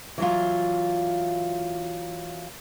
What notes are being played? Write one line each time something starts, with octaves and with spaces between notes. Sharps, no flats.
E3 F#3 F4